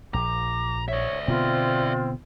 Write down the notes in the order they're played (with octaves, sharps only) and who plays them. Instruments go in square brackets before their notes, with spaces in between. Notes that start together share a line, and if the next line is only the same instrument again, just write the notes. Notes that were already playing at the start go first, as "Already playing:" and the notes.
[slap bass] A#1 [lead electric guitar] A#5 [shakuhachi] D6
[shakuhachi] C#5 [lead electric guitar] D5 E5
[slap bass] B2 D3 B3 [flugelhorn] C4 [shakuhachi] F4